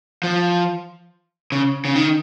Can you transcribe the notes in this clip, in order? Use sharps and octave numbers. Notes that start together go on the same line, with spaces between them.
F3
C#3
C#3
D#3